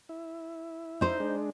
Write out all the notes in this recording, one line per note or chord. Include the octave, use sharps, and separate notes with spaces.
E4
D#4 C5
G#3 D4